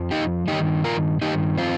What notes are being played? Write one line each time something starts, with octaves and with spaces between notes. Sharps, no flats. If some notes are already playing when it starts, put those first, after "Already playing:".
Already playing: F2 F3
D#4 G4
G2 D#3 D#4 G4
F4 A#4
G2 D#3 D#4 G4
C4 F4